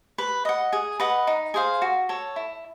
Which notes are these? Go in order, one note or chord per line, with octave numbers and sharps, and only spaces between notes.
B4
D#5 F#5
G#4
B4 D#5 F#5
D#4
G#4 C5 F5
F#4
A4 C#5
E4